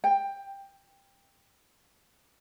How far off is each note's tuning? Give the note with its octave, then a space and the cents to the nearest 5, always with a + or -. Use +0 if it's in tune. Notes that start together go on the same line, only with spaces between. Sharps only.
G5 +15